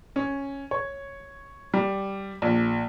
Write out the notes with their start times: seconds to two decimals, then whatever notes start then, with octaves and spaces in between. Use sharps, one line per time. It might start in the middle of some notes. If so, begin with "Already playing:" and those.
0.16 C#4
0.71 C#5
1.74 G3
2.42 A#1